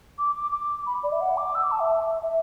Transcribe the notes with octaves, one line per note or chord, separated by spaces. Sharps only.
D6
D6
D6
B5
D5
E5
F#5
D6
E6
D6
A5
E5
E5